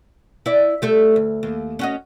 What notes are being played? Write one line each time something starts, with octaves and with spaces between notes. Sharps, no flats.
E4 D5
G3 A3 A4
D2
D#2
C#4 F#4 D#5